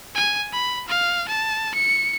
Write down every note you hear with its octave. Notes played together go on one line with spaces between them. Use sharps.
G#5
B5
F5
A5
C#7